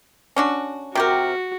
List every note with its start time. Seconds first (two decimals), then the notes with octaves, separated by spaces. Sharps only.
0.36 C#4 D4 F#4
0.95 C3 F#4 G4 A#4